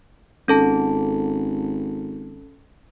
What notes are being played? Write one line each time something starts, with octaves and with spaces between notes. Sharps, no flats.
G#1 C#4 A4 A5